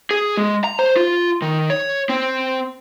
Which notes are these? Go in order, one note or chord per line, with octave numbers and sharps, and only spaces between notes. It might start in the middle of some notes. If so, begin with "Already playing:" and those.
G#4
G#3
A#5
C5
F4
D#3
C#5
C4